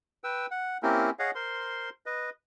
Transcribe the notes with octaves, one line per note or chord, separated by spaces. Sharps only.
B4 G5 E6
F#5
A#3 C4 C#4 E4 G4 A#4
G#4 C#5 D#5 F5 F#5
A#4 C5 C6
B4 D#5